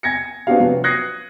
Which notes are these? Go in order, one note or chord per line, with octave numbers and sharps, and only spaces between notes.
G#5 G#6 A#6 C#7
B3 C4 D4 F#4 G4 F5
C3 F3 F#3 B3
D#6 F#6 G#6 A#6 C7 C#7